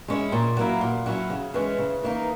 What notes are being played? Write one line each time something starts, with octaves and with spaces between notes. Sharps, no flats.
G#3 C#4 E4
A#2
F#3 A#3 E4
A#2
F#3 C#4 E4
C#3
E3 G#3 C#4
C#3
E3 A#3 D#4